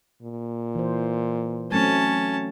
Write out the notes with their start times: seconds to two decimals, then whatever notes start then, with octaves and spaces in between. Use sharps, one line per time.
0.22 A#2
0.75 E3 C5
1.71 F#3 A3 C4 C#4 A5